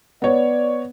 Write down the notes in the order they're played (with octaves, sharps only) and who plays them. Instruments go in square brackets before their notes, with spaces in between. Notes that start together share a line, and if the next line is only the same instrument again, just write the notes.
[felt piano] B3 C#5 [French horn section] D5